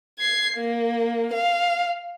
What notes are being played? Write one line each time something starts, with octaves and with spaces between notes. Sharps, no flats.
G#6 C7
A#3
F5